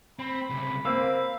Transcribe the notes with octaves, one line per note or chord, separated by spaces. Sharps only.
C4 B5
C#2 C3
A#3 C4 F5 E6